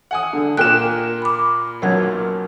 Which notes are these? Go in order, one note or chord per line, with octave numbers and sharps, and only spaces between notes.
F#5 G#5 D#6
D3
A#2 A#3 G5 G#5 F#6 E7
B5 D6
B1 F#2 A#4 F#5 G#6